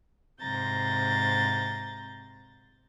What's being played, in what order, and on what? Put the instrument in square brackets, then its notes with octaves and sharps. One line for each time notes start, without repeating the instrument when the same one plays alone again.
[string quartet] G#2 C3 A#5 G6 A6